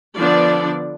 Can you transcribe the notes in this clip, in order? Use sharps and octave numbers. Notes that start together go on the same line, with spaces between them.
D3 F3 B3 D4 D5